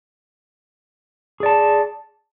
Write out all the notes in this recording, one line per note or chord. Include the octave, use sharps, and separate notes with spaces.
G#4 D5 A5